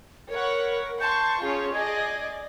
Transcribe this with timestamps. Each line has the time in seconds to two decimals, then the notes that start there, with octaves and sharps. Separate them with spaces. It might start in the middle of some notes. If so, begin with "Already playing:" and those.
0.30 A#4 C#5 F#5 B5
1.00 A5 C6 C#6 G6
1.42 C#4 F4 G#4 C#5
1.74 G#4 D5 D#5 G#6